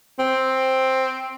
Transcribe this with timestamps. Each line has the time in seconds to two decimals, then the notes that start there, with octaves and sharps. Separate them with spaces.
0.19 C4